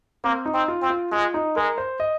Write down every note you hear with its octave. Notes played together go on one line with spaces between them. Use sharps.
A#3 C4
D#4
C4
F4
C4
F4
G#3 F4
D#4
G#3 A#4
C5
D#5